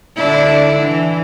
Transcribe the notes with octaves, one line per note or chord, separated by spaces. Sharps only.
D3 D4 E4
E3